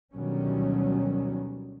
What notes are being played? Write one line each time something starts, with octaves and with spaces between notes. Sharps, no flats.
D2 B2 D#3 F#3 G3 C#4